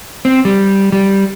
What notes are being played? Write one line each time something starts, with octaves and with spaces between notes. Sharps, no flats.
C4
G3
G3